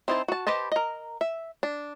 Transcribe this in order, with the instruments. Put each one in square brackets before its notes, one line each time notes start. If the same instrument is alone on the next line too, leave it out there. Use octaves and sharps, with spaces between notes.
[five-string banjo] C4 D#4 E4 C5 A5
F#4 A5
G4 B4 C5 D#5 A5
A#4 D#5
E5
D4